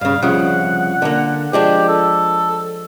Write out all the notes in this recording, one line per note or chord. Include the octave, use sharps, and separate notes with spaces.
G2 C#3 F5
C2 C#3 F3 F#5
D3 A#3
F3 G#3 D4 G4
A4